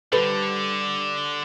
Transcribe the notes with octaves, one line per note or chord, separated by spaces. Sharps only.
D3 G3 A4 B4